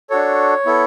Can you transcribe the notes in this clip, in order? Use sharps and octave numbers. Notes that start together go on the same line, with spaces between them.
D4 F#4 A4 C#5
B3 E4 A4